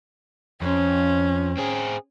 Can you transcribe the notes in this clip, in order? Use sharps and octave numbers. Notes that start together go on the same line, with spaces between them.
F2 C#4
C4 G#4